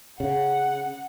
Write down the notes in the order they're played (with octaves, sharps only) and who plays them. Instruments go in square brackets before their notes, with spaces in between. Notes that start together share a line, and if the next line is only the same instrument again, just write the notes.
[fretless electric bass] C#3 [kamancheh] F#5